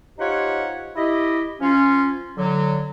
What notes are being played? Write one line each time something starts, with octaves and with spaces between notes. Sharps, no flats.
D#4 F4 G4 C5 C#5 F#5
E4 G4 D#5
F3 C#4 F4
D3 F#3